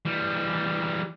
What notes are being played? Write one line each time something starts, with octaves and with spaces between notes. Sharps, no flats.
E3 G3